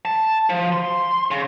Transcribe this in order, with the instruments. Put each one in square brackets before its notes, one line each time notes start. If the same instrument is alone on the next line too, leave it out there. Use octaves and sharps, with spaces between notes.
[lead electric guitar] A5
F3
C6
C#3